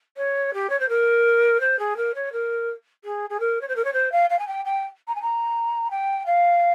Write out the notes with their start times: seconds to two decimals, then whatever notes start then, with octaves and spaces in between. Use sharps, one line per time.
0.17 C#5
0.53 G4
0.69 C#5
0.80 C5
0.89 A#4
1.60 C5
1.79 G#4
1.97 A#4
2.15 C#5
2.32 A#4
3.04 G#4
3.30 G#4
3.40 A#4
3.61 C#5
3.68 C5
3.76 A#4
3.84 C#5
3.93 C5
4.12 F5
4.30 F5
4.39 G#5
4.47 G5
4.65 G5
5.08 A#5
5.15 G#5
5.22 A#5
5.90 G5
6.26 F5